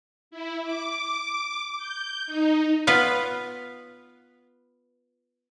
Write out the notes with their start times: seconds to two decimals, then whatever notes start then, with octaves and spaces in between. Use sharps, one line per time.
0.31 E4
0.63 D6
1.77 G6
2.26 D#4
2.87 B3 F4 B4